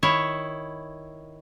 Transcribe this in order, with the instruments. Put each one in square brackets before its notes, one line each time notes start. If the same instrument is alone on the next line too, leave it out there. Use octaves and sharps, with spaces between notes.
[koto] D#3 E4 C#5